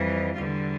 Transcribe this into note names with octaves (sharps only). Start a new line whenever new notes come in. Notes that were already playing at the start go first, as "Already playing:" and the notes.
Already playing: F2 E3 G3
E2 D3 G3 F4